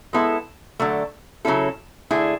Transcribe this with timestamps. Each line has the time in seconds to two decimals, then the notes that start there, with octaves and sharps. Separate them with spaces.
0.13 G#3 B3 E4 A4
0.80 D3 F#3 A3
1.45 C#3 F#3 C#4 E4 A4
2.11 D3 A3 E4 G#4